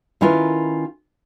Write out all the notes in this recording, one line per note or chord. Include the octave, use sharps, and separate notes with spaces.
D#3 C#4 E4 F4 A#4 B4